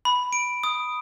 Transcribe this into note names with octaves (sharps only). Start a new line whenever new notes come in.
B5
D7
D#6